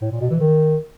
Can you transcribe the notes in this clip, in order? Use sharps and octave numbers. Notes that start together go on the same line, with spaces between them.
A2
A#2
B2
E3
D#3